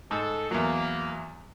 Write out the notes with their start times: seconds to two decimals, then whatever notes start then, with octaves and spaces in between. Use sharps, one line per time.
0.11 G#2 A4
0.51 E2 F#3 A#3